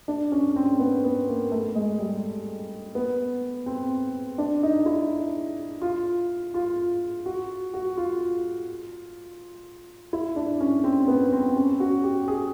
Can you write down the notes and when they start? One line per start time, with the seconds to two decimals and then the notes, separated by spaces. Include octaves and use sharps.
0.08 D4
0.32 C#4
0.56 C4
0.79 B3
1.04 B3
1.28 A#3
1.52 A3
1.75 G#3
2.00 G3
2.95 B3
3.66 C4
4.38 D4
4.63 D#4
4.86 E4
5.82 F4
6.54 F4
7.26 F#4
7.74 F#4
7.97 F4
10.13 E4
10.36 D4
10.60 C#4
10.84 C4
11.08 B3
11.32 C4
11.56 C#4
11.80 F#4
12.03 G4
12.28 G#4